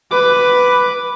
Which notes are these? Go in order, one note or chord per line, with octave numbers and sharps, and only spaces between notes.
B4 D6